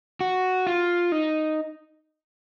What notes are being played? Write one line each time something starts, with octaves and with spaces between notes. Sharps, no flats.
F#4
F4
D#4